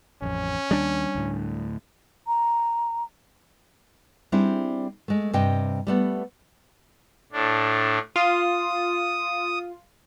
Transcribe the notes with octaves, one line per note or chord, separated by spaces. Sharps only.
A1 F2 C#4
D#2 G3 D4
D2 A2
A#5
G3 C4 D4 E4 G#4
G#3 A3
G2 C3 D#5 G5
G3 A3 B3
A2 D4
F4 D#6